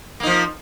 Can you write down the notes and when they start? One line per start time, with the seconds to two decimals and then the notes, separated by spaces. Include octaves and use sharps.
0.20 A#3
0.23 D#4
0.27 F3